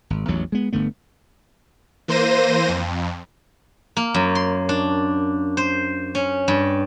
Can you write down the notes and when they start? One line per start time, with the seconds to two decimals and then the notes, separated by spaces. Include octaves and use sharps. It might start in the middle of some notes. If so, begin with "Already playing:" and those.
0.10 G#1
0.28 A1 E2 F#3
0.52 G#3 B3
0.73 G1 D3 A3 B3
2.08 E3 A#3 C5 A#6 D#7
2.68 F2
3.97 A#3
4.14 F#2
4.35 C6
4.69 D4
5.57 C5
6.15 C#4
6.48 G2